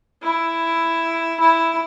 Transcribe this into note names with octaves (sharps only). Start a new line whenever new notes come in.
E4
E4